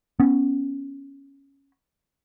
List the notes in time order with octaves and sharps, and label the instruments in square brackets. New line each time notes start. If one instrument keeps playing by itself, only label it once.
[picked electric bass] B3 C#4